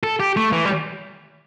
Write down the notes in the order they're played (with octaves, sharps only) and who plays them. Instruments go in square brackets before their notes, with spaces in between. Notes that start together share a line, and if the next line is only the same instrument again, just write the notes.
[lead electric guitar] A4
G4
A3
E3
G3